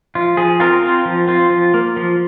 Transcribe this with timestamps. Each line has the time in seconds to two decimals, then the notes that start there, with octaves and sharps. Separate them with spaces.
0.15 F3 F4
0.37 F3 G#4
0.60 C4 F4 A#4
0.82 C4
1.05 F3
1.28 C4 F4
1.50 F3
1.74 A#3
1.97 F3